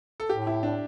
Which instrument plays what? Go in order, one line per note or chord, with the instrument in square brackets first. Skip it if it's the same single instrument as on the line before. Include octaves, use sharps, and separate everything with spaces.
[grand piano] A4
[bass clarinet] A2 [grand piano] G4
[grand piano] E4
D4